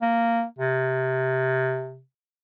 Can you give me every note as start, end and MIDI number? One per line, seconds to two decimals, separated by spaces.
0.02 0.44 58
0.59 2.01 48